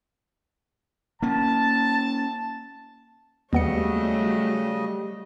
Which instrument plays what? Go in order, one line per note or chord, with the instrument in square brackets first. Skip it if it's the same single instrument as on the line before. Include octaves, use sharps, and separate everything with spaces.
[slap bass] A#3 C#4 [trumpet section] A5
[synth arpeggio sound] D#2 B3 C#7 [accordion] C#3 D#5 [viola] F#3 A3 [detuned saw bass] G3